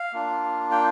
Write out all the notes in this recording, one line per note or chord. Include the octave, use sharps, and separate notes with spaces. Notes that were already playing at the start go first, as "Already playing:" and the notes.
Already playing: F5
A#3 D4 F4
G5